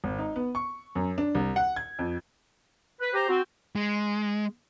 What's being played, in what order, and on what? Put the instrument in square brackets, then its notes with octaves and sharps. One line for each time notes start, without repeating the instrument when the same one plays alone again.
[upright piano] G#1
D#4
B3
C#6
F#2
D4
C2
F#5
G#6
F2
[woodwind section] B4
[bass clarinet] G4 [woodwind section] C5 A#5
[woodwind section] C4 [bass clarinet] F#4
[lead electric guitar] G#3